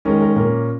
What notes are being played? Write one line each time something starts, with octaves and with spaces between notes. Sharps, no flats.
D#3 G#3 C#4 A#4
A#4
A#2 A#3 C#4 A#4